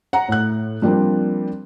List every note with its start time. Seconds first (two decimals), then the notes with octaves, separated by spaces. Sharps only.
0.13 F#5 A#5
0.29 A2 F#6
0.82 F3 G3 A#3 C4 D4